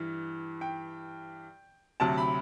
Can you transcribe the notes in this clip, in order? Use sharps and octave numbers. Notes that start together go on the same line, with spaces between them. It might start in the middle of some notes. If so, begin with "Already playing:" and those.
Already playing: G2 E3
G5
D2 C3 F#3 A5
B5